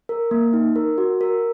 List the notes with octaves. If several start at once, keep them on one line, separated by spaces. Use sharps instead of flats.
A#4
A#3
D#4
A#4
F#4
A#4